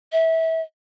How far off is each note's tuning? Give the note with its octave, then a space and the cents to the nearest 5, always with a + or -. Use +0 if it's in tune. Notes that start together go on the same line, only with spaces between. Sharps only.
E5 -25